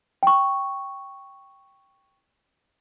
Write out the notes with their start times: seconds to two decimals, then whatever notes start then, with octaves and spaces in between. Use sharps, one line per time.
0.23 G5 C#6